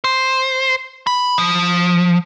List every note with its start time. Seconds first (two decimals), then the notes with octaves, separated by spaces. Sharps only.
0.04 C5
1.07 B5
1.38 F3